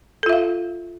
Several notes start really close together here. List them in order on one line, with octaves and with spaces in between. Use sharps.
A4 F4 E5 F5